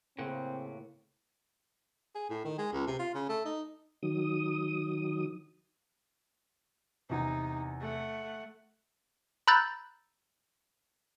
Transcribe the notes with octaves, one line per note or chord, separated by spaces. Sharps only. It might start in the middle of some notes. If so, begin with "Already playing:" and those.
A2 C#3 A#3 C4 F#5
G#4
A2
D#3
G#3
C#2
C3
F4
C#3
A3
D#4
D#3 F#3 D#6
E2 C3 D#4
A3 F#5
A#5 B5 E6 F#6 G6 A6